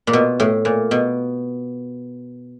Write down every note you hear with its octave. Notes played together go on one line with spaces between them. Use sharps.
A#2
B2
A2
A#2
B2